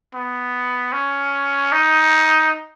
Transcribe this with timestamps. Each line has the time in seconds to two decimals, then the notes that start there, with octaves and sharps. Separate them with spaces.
0.14 B3
0.93 C#4
1.72 D#4